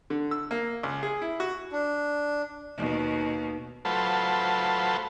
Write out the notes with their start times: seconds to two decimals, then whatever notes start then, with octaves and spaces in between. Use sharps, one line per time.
0.10 D3
0.31 E6
0.51 A#3
0.83 C#2
1.03 G#4
1.22 E4
1.40 F#4
1.72 D4
2.77 D#2 B2
3.85 F#3 A3 F4 A4 B4 C5